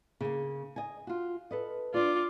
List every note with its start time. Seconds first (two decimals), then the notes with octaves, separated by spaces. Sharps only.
0.21 C#3 A#3
0.76 D#5 G#5
1.07 F4 F#4
1.51 A4 B4 D#5
1.94 D4 F4 D5 D6